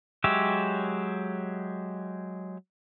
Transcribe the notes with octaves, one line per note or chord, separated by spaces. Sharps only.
F#3 G#3 G4 C#5 E5